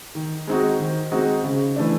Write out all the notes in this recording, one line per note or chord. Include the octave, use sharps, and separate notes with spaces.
D#3
G#3 C4 D#4 F#4
D#3
G#3 C4 D#4 F#4
C#3
E3 A3 D4